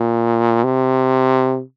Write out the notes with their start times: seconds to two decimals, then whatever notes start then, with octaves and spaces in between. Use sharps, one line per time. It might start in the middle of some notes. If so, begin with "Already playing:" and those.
Already playing: A#2
0.64 C3